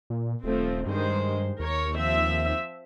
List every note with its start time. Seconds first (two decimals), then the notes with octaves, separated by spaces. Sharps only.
0.10 A#2
0.44 D#1 F3 A3 C4
0.87 G2 D#3 G#3 C5
1.60 D#2 A#4 C#5
1.95 F3 C4 E5